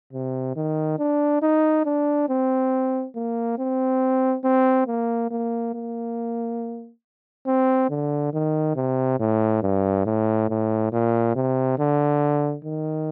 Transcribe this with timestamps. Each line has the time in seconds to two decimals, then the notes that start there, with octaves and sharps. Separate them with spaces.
0.13 C3
0.56 D#3
0.99 D4
1.42 D#4
1.85 D4
2.29 C4
3.16 A#3
3.58 C4
4.44 C4
4.87 A#3
5.31 A#3
5.75 A#3
7.47 C4
7.90 D3
8.33 D#3
8.76 C3
9.20 A2
9.63 G2
10.06 A2
10.49 A2
10.92 A#2
11.36 C3
11.79 D3
12.65 D#3